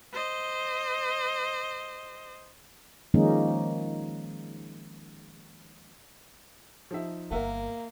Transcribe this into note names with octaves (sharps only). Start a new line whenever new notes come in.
C5 D#5
D#3 F3 G#3 A#3 C#4 D#4
F3 D#4 E5
G1 A#3 B3 A#4 E5 F#5